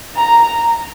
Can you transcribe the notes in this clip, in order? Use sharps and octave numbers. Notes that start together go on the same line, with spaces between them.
A#5